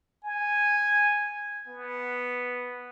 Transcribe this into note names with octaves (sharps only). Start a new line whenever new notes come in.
G#5
B3